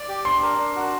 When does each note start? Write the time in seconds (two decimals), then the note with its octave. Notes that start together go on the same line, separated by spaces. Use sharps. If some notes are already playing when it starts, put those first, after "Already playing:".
Already playing: D5 D6
0.09 G4
0.25 D4 C6
0.43 A#4
0.58 D4
0.76 F#4